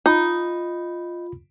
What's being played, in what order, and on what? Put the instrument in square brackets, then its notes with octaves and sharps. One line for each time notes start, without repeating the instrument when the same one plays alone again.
[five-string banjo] D#4 [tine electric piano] F4 B5